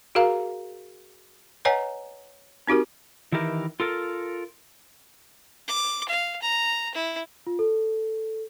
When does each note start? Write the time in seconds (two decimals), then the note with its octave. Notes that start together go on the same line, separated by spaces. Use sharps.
0.15 F#4 G#4 A#4 F5 A#5
1.65 B4 C#5 D#5 F#5 G#5 A#5
2.67 C4 D#4 F#4 G4 A#4
3.32 D#3 E3 E4 G4 A#4
3.80 F4 A4 A#4
5.68 D6
6.08 F5
6.42 A#5
6.94 E4
7.47 F4
7.59 A4